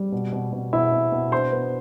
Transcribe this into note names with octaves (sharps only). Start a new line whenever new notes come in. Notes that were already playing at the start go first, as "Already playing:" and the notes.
Already playing: G3
B2
B2
B2
B2 E4 E5
B2
B2
D4 C5 C6
B3